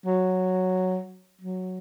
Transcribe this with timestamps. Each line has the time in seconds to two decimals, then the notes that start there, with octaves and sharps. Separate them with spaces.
0.06 F#3
1.41 F#3